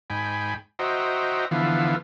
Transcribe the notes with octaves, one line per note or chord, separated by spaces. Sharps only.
G#2 G5 G#5 B5
F#4 C5 D#5 E5 G5 A#5
D3 E3 F3 B3 E5 F5